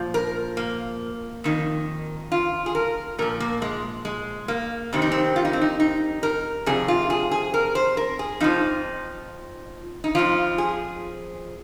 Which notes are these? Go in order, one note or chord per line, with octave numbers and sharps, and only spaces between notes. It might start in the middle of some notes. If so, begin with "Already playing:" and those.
Already playing: A#2 F3
A#4
A#3
F2 D#3
F4
G#4
A#4
A#2 F3 A#4
A#3
G#3
G#3
A#3
F2 C3 D#3 C4
D#4
C4
F4
D#4
C4
D#4
D#4
A#4
F2 C3 G#4
F4
G#4
G#4
A#4
C5
A#4
G#4
F2 F3 D#4
D#4
F2 F3 F4
G#4